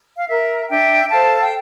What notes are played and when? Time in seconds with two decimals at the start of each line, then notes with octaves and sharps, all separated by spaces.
0.18 F5
0.29 A#4 E5
0.70 D4 E5 G5
1.10 A4 C5 F5 A5
1.40 G5